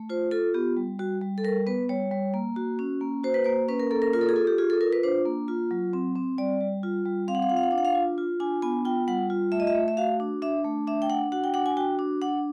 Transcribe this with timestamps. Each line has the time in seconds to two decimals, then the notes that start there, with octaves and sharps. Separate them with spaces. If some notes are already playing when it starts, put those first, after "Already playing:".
Already playing: A3
0.09 F4 C5
0.31 F4 A4
0.54 B3 G4
0.77 G3
0.99 G3 F#4
1.21 G3
1.38 A4
1.44 G3 A#4
1.67 B3 B4
1.89 G3 C#5
2.11 G3
2.34 A#3
2.56 F#4
2.79 C#4
3.01 A#3
3.24 F#4 C5
3.34 B4
3.44 A#3 C5
3.68 C#4 B4
3.80 A#4
3.91 A#3 A4
4.02 A#4
4.13 F4 A#4
4.21 A4
4.29 G#4
4.36 F4 A4
4.47 G4
4.58 F4 G#4
4.70 A4
4.81 F4 A#4
4.93 B4
5.03 D4 C5
5.26 A#3
5.48 F4
5.71 F#3
5.93 C4
6.15 C4
6.38 G3 D5
6.60 G3
6.83 F4
7.05 G3
7.28 C4 F5
7.35 F#5
7.42 F5
7.49 F4 F#5
7.57 F5
7.63 F#5
7.71 D4 F5
7.78 F#5
7.85 F5
7.95 F4
8.18 F4
8.40 D4 G#5
8.62 B3 G#5
8.85 F4 G5
9.08 G3 F#5
9.30 F4
9.52 A3 E5
9.60 D#5
9.67 E5
9.75 A3
9.88 E5
9.97 F#4 F5
10.20 D4
10.42 D4 E5
10.64 A3
10.87 D4 E5
11.02 G5
11.10 D4 F#5
11.32 F#4 F#5
11.44 G5
11.54 D4 F#5
11.66 G#5
11.77 F#4 G5
11.99 D4
12.22 D4 F#5